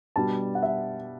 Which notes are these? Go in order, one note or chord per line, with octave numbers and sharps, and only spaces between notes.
B2 G3 D4 A5
F#5
E5